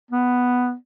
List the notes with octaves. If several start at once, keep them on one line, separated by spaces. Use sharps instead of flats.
B3